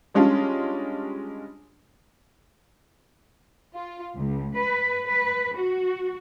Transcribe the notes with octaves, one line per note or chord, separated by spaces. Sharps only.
G3 G#3 C#4 D4 F4
F4
C#2
B4
B4
F#4